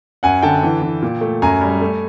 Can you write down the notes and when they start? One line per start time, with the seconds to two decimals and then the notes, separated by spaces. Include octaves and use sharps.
0.23 F#2 F#5 G#5
0.42 D3 G5 A5
0.63 E3
0.82 E3
1.02 A#2
1.21 A3
1.42 F#2 G#5 A#5
1.61 G3
1.81 A3